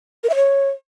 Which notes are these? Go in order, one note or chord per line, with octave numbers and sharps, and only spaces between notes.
A#4
E5
C#5